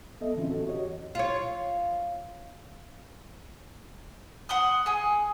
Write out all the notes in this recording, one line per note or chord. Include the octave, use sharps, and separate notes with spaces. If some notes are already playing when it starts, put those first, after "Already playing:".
B3 A4 D#5 E5
A2 D3 E3 C4 C#4 F4
F#4 A4
F#4 G4 C#5 D#5
E2
F4 C#5
F#5 C6 D#6
G#4 G#5